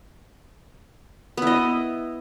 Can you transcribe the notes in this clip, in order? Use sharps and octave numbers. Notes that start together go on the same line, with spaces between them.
B3 E4 D#5